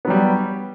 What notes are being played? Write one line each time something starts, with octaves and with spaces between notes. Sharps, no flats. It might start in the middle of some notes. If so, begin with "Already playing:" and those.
F#3 G3 B3